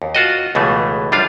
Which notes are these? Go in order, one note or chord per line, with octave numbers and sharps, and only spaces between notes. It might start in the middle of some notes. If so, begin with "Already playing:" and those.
D#2
F4 F#4 D#5
C#2 B2 E3 A3
F#2 G3 D4 F4 F5